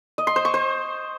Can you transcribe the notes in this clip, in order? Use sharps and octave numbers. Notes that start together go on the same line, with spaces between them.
D#5
C6
C5
C#6
C5